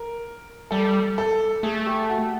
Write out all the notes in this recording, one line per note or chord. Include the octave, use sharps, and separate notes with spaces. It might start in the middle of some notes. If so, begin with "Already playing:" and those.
Already playing: A#4
G3 A4
A4
A3 G#4
G4
F#4